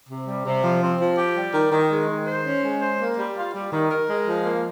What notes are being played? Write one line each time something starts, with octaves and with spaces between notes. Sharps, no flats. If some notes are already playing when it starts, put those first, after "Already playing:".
C3
G3
C3
F3
C4
F3
G4
G3
D#3
D#3
G#3
D#3
C5
C#4
G#3
C5
A#3
G3
F4
G3
D#3
A#4
G#3
F3
A#3